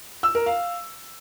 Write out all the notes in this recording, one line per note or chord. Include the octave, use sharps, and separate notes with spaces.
E6
A#4
F5